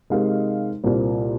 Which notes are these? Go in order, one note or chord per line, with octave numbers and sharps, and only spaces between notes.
C3 G#3 D#4 A#4 F5
C2 A#2 A#3 F4 C5